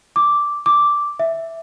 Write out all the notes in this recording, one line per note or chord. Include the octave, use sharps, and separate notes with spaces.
D6
D6
E5